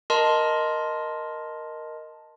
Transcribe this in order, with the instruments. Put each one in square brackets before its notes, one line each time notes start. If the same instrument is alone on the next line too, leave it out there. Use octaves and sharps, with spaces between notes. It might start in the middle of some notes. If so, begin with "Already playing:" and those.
[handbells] A#4 D#5 A5 C6